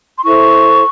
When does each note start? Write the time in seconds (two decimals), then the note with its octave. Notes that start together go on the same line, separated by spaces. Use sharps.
0.18 C6
0.24 E4 A4 C5 C#6